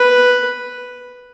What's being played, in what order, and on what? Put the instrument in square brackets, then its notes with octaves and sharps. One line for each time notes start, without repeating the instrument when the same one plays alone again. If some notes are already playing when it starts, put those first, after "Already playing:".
Already playing: [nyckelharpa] B4